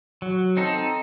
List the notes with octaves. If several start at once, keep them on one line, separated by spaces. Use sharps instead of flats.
F#3
C4 D#4 A4